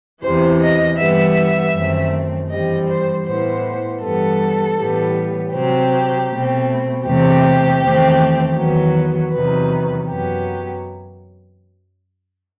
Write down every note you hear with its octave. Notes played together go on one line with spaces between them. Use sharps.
E2 C3 E3 C5
D#5
G2 E3 G3 B3 E5
F#2 D#3 A3 C4
G2 E3 G3 C4 D#5
C5
A2 E3 B3 C5
G2 E3 G3 B3 A4
A2 E3 G3 B3
C3 F#3 C4 G4
B2 A3 C4
E2 C3 E3 A3 C4 G4
E2 D#3 A3 C4
E2 D#3 F#3 B3
E2 C3 D#3 F#3 B4
F#2 F#3 B3 G4